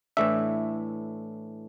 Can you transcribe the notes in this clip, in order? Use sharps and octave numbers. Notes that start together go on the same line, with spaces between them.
A2 E3 A3 D4 E5